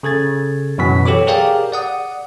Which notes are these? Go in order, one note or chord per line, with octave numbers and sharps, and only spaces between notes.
C#3 A4 G#6 A6
F#2 B2 E3 B6
G4 A4 C#5 D6
G4 G#4 A#4 D5 F5 G5
D5 F#5 D#6